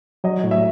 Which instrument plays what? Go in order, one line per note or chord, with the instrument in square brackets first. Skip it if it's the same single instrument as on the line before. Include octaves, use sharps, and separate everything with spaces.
[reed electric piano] F#3 [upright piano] D#5
[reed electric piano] A2
[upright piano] E5